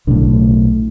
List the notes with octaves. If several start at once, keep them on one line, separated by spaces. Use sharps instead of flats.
B1 A2 D3